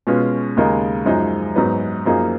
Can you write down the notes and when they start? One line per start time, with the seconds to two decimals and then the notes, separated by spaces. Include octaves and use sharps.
0.07 B2 G#3 C#4 F4 B4
0.57 D#2 C#3 G#3 D#4 A#4
1.06 F#2 F3 G#3 D#4
1.56 G#2 F#3 B3 D#4
2.06 F#2 F3 A#3 D#4 G#4